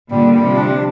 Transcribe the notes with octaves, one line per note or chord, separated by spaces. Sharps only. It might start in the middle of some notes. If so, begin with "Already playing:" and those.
A#2 D3 G3
G3
C3 F3
D4